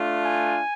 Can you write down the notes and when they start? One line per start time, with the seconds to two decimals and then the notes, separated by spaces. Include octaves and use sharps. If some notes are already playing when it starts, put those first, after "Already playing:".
Already playing: A3 D4 F4
0.25 G#5